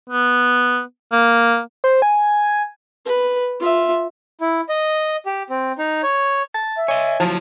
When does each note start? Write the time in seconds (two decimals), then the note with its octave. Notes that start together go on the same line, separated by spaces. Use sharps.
0.10 B3
1.12 A#3
1.84 C5
2.02 G#5
3.05 B4
3.60 F4 E5
4.41 E4
4.69 D#5
5.26 G4
5.50 C4
5.78 D#4
6.03 C#5
6.55 A5
6.77 E5
6.88 C#5 D#5 G#5
7.20 F3 F#3 E4